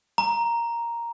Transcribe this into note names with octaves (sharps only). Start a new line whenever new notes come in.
A#5